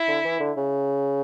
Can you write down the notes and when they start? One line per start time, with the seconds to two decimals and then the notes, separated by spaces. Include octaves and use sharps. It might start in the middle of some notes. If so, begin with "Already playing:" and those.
Already playing: E4
0.08 D3
0.25 E3
0.40 D3
0.57 C#3